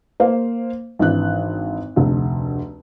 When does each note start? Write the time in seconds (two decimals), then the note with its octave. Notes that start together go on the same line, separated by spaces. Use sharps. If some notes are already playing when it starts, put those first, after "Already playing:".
0.20 A#3 C5 F5
0.99 G#1 E3 D4 F#6
1.96 F1 D2